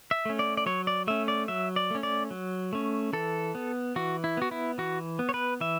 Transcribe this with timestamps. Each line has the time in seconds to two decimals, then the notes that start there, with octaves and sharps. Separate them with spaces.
0.11 E5
0.25 A3 C#4
0.39 D5
0.57 D5
0.66 F#3 C#5
0.87 D5
1.07 A3 C#4 E5
1.28 D5
1.48 F#3 E5
1.76 D5
1.91 A3 C#4
2.03 D5
2.31 F#3
2.73 A3 C#4
3.13 E3 A4
3.55 B3
3.96 E3 F#4
4.24 E4
4.37 B3 F#4
4.51 E4
4.78 E3 F#4
5.19 B3
5.29 C#5
5.34 B4
5.61 E3 E5